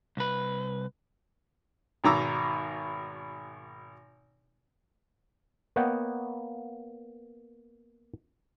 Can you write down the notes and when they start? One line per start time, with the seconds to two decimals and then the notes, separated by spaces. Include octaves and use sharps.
0.17 C2 B4
2.04 G#1 B2 D#3 A#5 D6 E6
5.76 A#3 B3 C#5 D#5 F#5 G5